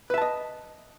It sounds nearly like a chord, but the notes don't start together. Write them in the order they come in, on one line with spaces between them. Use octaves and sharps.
B4 E5 A5 D#5